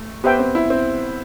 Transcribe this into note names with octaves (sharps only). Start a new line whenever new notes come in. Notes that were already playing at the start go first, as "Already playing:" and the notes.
Already playing: A3
B3 G4 C5 E5 G5
C4
E4
C4